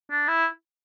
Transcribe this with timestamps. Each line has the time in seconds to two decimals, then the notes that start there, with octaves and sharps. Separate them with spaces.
0.11 D4
0.28 E4